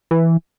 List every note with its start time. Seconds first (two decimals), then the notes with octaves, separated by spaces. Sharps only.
0.11 E3